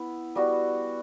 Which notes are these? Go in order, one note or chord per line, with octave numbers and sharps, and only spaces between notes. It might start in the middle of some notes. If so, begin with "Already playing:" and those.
Already playing: B3 E4
G3 B3 F#4